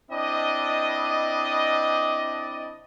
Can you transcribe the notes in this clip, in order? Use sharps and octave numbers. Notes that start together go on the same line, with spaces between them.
C4 D4 E4 D5 D#5